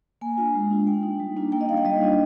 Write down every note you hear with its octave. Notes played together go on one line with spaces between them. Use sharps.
A#3 G#5
D4 F4
G#3
D4 F4
A#3 G5
D#4
G3
A#3 D4 F4
A#3 G5
D#5
D#4 F5
G5
G3 D#5
D4 F4